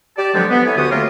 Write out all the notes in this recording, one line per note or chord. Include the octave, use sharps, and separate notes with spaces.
G4 D5 A5
D3 F3 F#3 G#3 B3 C4
B3
E4 A4 B4 C#5 G#5
D2 D3 F#4 G4 D#6
F#3 A3 A#3 C4 F4 A#4